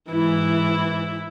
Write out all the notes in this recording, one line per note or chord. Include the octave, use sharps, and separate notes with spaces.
G#2 E3 E4